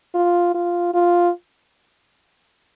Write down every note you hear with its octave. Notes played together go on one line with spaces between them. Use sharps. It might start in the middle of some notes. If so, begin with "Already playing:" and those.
F4
F4
F4